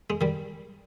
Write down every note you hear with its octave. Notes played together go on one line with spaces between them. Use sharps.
G#3
D#3 G3